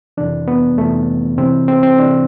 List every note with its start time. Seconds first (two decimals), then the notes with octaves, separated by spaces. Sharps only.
0.17 F2 C3 E3 D4
0.48 B3
0.78 F2 C3 E3 A3
1.38 C2 C3 E3 C4
1.68 C4
1.83 C4
1.98 C3 E3 D4